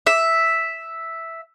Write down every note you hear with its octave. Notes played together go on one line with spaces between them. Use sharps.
E5